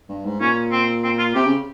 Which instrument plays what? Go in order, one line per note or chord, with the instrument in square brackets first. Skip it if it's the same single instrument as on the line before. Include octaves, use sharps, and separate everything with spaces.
[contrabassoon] G2
G#2
[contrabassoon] A#2 [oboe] C#4
[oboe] C4
C4
F4
[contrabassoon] C3 [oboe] G4
[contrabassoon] C#3